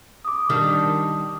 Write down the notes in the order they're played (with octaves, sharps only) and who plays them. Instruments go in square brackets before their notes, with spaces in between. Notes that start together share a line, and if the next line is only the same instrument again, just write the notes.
[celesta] D6 D#6
[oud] D#3 G3 D4